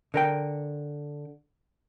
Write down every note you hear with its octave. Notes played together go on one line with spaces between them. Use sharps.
D3 A#4 G5